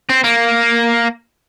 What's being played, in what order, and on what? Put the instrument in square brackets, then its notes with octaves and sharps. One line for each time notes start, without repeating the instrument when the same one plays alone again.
[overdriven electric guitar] C4
A#3